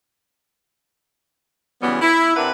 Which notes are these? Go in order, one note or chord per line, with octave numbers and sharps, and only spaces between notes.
C#3 E3 F#3 G3 B3
E4
C3 D4 A#4 B4 E5 F#5